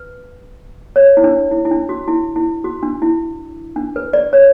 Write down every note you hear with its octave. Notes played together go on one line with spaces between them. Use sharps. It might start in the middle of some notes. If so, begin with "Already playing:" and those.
Already playing: B4
C#5
E4
D4
E4
E4
D4
F#4
E4
E4
F#4
D4
E4
D4
B4
D5
C#5